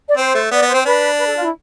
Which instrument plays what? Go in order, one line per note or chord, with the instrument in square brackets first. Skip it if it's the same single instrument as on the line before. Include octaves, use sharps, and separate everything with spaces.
[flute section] D5
[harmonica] C4 [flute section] C5
[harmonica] A3
[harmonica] B3 [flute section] D5
[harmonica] B3
[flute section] C5
[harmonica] C4
[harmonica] D4 [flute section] B4
[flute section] B4
A4
F4
E4